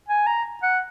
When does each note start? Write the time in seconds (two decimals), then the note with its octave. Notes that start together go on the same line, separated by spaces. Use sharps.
0.09 G#5
0.26 A#5
0.63 F#5